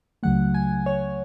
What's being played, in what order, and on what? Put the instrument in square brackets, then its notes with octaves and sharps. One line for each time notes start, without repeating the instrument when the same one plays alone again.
[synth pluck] C#2 C#3 F#3 A3 F#5
G#5
C#5